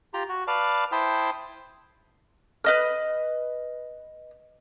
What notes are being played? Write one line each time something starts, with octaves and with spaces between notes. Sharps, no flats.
F4 G4 A#5
F#4
B4 D5 F5 A5
E4 C5 G5 A5 B5 D#6
B4 D#5 F6